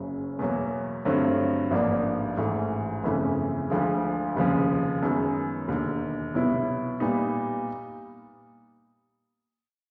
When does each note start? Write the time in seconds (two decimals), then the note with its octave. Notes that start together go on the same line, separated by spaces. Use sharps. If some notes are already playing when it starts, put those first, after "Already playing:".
Already playing: F#1 F#2 C#3 F#3
0.39 E2 B2 F#3 A#3
1.05 G2 D3 F#3 A3 C4
1.71 A1 G#2 F3 A#3 D4
2.37 A1 G#2 E3 A3
3.03 G1 F2 C#3 E3 A3
3.70 D2 D3 F3 G#3
4.36 F1 D#2 C#3 F3
5.03 F#2 D#3 G#3 B3
5.68 E1 D#2 D3
6.34 C2 B2 F#3 B3 E4
7.00 A#2 G3 B3 D#4